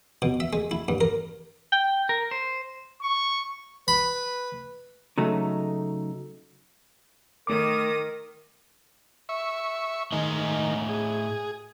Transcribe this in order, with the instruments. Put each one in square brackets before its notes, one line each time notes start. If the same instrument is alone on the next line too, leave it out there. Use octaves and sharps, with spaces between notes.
[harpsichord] B2
E5
G#3
E4
G2
A#4
[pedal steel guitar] G5
A#4
C5
[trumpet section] C#6
[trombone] B4 [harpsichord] B5
[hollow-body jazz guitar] C#3 F#3 A3 D#4
[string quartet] D#3 D#6 [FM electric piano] A3 D6 [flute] A#4
[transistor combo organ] E5 C#6
[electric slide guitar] A2 D#5 G#5 [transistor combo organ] D#3
[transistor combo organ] G#4